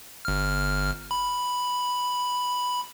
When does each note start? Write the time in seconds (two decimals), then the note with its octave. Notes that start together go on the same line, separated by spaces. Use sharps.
0.25 G1 F6
1.11 B5